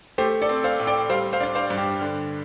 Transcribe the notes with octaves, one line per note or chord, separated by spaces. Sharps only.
A3 G4 C5
A4 D5
C4
C5 F5
A2
D5 G5
G3 C5 F5
C5 F5
D4 D5
C5 F5
G2
G4
D3